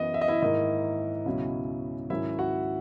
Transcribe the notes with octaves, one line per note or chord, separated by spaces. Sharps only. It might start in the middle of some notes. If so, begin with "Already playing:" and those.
Already playing: F#2 E3 B3 D#5
E5
D#5
E4 E5
G#2 D#3 A#3 E4 D#5
C#2 B2 F#3 C#4 E4
G#2 D#3 F#3 C#4 E4 E5
F#4 F#5